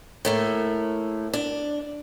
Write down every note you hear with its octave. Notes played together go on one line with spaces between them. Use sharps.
A2 A3 A#3
D4